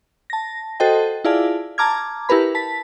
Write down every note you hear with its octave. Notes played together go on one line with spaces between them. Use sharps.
A5 A#6
F#4 A4 C5 D#5 G5
E4 F4 G#4 D5 F5 A5
A5 A#5 D6 F6 G#6
E4 G4 A#4 B4 B5
A5 B6